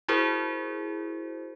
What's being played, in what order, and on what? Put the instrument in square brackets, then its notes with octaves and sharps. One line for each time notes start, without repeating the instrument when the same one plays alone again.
[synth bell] E4 F#4 G#4 A#4 C5